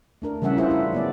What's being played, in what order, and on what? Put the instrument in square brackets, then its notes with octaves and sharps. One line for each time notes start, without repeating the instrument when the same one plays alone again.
[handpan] A3 D4 A#4
C#3 E3 G3 C#4 E5 F#5
D4 E4 F4 G#4 C5 E5
E4
F#3 B3 D5